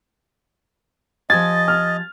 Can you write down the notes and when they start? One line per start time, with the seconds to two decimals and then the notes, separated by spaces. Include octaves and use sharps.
1.30 F3 G4 D#5 G#5 G#6 A6
1.68 F6